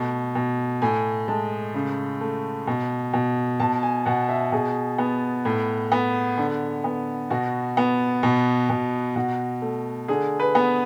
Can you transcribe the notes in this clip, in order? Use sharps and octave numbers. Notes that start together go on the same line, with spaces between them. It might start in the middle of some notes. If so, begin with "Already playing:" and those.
Already playing: B2 A3
B2
A2 G#5
G#3 A5
C#3
A3
B2
B2
B2 A5
G#5
B2 F#5
E5
B2 G#4
B3
A2
B3
D3
B3
B2 F#4
B3
B2
B2
B2 F#4
A3
D3 G#4
B4
B3